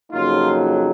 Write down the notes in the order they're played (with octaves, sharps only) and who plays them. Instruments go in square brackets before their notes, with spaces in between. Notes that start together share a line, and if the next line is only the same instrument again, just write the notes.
[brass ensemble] F2 C#3 F#3 A#3 D#4 F4